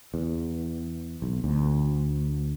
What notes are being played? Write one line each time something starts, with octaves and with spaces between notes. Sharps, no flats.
E2
B1
D2